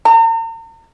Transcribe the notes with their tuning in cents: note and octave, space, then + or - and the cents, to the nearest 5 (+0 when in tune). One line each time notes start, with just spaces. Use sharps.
A#5 -45